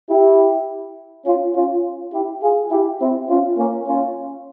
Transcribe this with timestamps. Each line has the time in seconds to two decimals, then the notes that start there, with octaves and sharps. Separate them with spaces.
0.09 E4 G4
1.26 C#4 F4
1.55 C#4 F4
2.13 E4 G4
2.42 F4 G#4
2.71 E4 G4
3.00 C4 E4
3.29 C#4 F4
3.58 A#3 C#4
3.87 C#4 F4